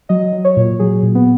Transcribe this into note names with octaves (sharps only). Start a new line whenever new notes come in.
F#3 D#5
F#3
C#5
A#2
F#3 G#4
A#2
B3